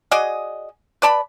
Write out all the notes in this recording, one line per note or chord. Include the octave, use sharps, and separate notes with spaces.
F#4 G#4 D5 D#5
B4 D5 A5 B5